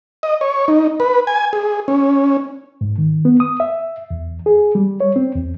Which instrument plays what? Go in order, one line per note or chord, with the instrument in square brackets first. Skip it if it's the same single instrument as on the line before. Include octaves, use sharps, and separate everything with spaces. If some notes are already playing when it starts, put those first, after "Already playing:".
[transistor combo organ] D#5
C#5
D#4
B4
G#5
G#4
C#4
[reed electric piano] G#2
D#3
B3
D#6
E5
E2
G#4
G3
C#5
C4
E2